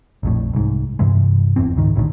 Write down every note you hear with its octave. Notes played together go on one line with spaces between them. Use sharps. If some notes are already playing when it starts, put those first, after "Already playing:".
A#1 F2 A2
C2 G#2
G2 C3 E3 G#3
F1 E2 E3 C4
C#2 G#2 D#3
B1 A2 D3 D#3